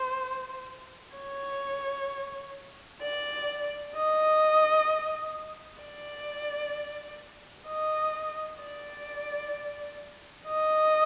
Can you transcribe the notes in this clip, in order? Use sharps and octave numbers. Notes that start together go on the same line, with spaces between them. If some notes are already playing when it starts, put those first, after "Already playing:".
Already playing: C5
C#5
D5
D#5
D5
D#5
D5
D#5